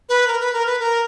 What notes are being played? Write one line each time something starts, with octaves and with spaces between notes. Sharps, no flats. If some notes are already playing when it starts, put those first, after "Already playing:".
B4
A#4
B4
A#4
B4
A#4